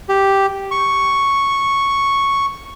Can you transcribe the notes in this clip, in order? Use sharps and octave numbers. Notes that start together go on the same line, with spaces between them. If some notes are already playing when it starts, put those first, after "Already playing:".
G4
C#6